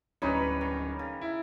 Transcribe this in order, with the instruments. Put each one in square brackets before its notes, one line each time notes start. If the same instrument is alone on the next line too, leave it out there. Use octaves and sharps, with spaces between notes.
[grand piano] D1 C#4 [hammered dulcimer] G3 D#4 B4
[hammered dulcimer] D#3
C#3
[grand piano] E4